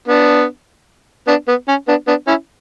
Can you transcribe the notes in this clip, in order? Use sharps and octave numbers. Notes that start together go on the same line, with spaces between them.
B3 D4
B3 D4
B3
C#4
B3 D4
B3 D4
C#4 E4